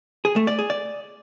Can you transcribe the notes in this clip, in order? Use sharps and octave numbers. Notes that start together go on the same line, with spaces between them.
G#4
A3
D5
G#4
D5